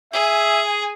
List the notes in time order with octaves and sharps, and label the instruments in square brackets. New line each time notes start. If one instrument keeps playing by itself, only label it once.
[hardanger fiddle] G#4 [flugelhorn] E5 [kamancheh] G#5